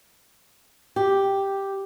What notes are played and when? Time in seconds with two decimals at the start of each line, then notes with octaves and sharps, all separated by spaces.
0.96 G4